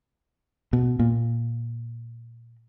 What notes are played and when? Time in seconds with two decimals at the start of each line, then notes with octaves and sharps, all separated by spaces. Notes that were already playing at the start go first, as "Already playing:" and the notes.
0.73 B2
0.99 A#2